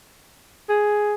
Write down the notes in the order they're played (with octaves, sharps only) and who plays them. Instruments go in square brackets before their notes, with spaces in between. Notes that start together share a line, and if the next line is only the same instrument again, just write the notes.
[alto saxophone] G#4